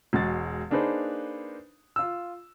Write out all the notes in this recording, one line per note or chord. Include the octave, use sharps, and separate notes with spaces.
E1 G#3 F#4 A6
A#3 D4 D#4 G#4 B4 C5
F4 E6